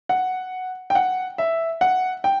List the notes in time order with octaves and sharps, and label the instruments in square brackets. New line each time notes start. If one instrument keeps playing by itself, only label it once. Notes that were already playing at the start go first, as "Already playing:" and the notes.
[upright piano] F#5
G5
F#5
E5
F#5
G5